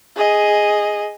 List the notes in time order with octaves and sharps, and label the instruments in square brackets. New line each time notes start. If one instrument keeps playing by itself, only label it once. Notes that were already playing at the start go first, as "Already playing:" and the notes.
[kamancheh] G#4 D#5